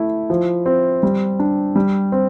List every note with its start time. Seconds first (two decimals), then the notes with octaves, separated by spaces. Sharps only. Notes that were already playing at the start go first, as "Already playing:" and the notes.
Already playing: A3 E4
0.30 F3
0.66 C4
1.03 G3
1.40 D4
1.76 G3
2.12 C4